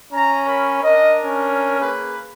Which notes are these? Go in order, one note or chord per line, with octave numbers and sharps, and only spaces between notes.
C#4 A#5
A#4 C#5 B5
D4 A#4 D#5
C#4
A#3 G#4 B4